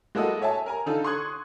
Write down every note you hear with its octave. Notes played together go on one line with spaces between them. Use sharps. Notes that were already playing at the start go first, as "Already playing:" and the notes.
G#3 A#3 E4 F#4 A4 D#5
C#5 E5 G#5 A5
A#4 G#5 A#5
D3 D#4 F4 A4
C6 C#6 D#6 F#6 G#6